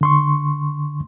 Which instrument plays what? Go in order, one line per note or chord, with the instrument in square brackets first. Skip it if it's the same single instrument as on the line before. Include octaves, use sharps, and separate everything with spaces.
[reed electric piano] D3 C6 C#6